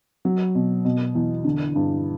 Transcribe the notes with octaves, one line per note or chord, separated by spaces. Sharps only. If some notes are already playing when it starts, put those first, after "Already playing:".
F#3
B2
B2
E2
D3
G2